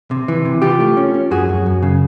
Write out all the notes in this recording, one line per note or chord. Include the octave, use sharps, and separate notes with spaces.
C3
E3
C3
E3 F4 G4
A3
C#4
C#4
F#2 F#4 G#4
F#2
F#2
C#3